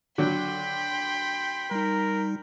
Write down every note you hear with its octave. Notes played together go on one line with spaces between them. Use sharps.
D3 F#3 G5 B5 C6
G3 D#4 A#4